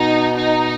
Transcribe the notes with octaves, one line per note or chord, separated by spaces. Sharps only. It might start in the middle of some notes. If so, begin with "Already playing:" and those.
Already playing: B2 D#4
D#4